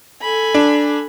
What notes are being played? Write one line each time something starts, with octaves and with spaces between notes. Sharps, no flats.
A4 G#5 B5
D4